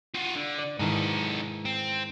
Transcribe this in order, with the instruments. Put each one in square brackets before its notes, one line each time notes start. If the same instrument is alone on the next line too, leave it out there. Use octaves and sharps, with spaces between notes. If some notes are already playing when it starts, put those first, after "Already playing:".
[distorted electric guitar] F4 F#4
D3
[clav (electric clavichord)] D5
[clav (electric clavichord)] G#2 D#3 E3 [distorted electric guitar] D#4 A4
[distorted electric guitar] C4